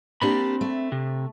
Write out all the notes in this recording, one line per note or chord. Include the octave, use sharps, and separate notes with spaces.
A#3 C4 D4 G4 B5
A3
C3